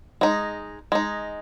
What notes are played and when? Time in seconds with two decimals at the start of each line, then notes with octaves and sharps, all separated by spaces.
0.21 G#3 D#4
0.92 G#3 D#4